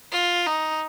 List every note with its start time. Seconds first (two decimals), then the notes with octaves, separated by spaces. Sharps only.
0.12 F4
0.47 D#4